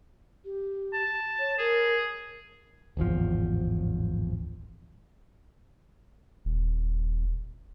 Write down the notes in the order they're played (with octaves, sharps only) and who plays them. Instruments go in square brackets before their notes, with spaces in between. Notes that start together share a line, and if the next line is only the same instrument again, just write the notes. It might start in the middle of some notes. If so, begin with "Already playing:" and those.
[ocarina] G4
[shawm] A5
[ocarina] C#5
[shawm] G#4 [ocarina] A#4
[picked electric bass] D1 G#1 E2 F3
[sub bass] D#1